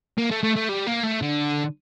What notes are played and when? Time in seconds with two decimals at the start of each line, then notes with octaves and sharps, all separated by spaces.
0.18 A#3
0.31 A3
0.43 A3
0.56 A3
0.69 G3
0.87 A#3
1.03 A3
1.22 D3